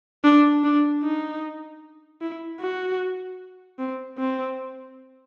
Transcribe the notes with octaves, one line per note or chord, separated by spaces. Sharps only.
D4
D4
D#4
E4
F#4
C4
C4